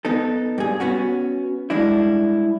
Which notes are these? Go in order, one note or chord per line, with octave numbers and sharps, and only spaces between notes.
B3 D#4 A4
G2 G#4
B3 C#4 F#4
G3 G#3 D4 E4